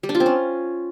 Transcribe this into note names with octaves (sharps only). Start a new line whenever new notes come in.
G3
D4
F4
C4
C#4